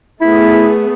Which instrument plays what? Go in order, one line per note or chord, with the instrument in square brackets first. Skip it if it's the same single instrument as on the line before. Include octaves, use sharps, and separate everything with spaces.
[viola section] A3 B3 G#4 [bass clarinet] E4